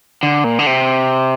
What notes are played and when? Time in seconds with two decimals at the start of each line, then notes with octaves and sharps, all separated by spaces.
0.23 D3
0.44 A#2
0.59 D3
0.67 C3